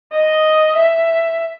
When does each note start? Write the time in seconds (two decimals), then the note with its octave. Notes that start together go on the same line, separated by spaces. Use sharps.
0.12 D#5
0.75 E5